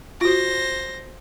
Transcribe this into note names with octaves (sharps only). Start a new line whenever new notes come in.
F4 F#4 C5 A#6